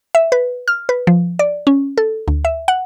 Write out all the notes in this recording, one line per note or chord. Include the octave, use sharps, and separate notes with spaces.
E5
B4
F6
B4
F3
D5
C#4
A4
D2
E5
F#5